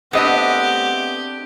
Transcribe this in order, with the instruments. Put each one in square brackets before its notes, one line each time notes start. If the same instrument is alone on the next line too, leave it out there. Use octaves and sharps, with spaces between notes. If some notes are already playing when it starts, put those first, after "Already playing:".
[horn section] A3 F#5 [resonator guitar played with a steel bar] B3 D#5 [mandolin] C4 D4 [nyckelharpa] G4